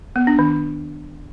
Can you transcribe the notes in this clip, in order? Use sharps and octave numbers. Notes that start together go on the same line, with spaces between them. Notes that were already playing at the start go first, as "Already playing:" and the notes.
B3
D4
D#3